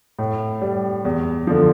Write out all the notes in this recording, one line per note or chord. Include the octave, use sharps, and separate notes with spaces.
A2
G3
E2
D3 F3